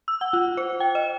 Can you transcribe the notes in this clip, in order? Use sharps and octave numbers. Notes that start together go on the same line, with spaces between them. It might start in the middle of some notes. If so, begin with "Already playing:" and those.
E6
F#5
F4
C5
G5
D#5